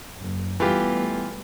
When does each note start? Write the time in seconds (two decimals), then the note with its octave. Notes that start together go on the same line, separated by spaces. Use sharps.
0.18 F#1
0.60 E3 G3 A3 B3 F4 G4